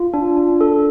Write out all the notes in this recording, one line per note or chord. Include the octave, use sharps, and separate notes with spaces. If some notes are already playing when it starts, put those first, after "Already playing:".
Already playing: F4
D4
D4
A4